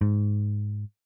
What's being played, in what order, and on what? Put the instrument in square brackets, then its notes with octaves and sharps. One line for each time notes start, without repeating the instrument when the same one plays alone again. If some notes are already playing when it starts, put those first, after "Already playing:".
[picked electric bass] G#2